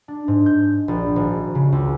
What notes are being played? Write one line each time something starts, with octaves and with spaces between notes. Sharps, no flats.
D4
G#2
G6
A#1
G#1
C#3
C#2